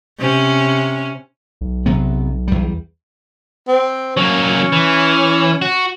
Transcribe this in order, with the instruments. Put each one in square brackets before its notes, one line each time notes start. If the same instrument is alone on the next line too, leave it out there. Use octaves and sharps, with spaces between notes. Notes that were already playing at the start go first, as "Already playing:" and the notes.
[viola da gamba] C3 C#4
[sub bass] B1
[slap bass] C3 F#3 B3
E2 G3
[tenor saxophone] C4
[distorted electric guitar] F#3 A#3 [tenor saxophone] C#4
[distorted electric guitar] E3
F#4